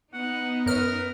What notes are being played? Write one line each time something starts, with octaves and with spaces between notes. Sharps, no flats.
B3 D#4 F#5
F#2 A#4 B4 F6